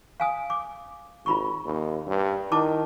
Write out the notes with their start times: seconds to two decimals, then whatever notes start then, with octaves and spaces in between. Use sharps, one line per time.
0.20 F5 G#5 D#6
0.50 D6
1.26 G#1 F4 B5 C#6
1.64 D#2
2.07 G2
2.52 D#3 E4 A5 D6